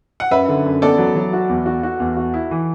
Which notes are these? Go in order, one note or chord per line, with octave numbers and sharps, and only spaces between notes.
F#5
F#2 B4 E5
D3
F#2
B3 A4 D5
F#3
F#3
F#4
E2
F#4
F#4
E2
F#4
E4
E3